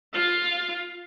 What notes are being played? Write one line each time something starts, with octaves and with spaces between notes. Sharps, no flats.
F4 F5